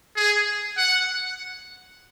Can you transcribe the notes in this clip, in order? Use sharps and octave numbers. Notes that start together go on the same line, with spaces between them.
G#4
F#5